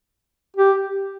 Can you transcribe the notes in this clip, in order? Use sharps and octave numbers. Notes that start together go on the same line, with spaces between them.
G4